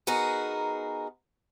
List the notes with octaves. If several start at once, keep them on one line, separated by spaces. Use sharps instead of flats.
B3 D#4 F#4 G#4 A#4